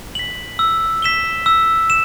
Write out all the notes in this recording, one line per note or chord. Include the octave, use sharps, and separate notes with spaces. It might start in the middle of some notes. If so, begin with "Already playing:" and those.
B6 F#7
E6
B6 E7 G7
E6
E7